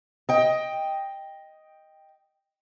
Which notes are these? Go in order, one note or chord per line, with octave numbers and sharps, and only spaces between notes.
D#5 G5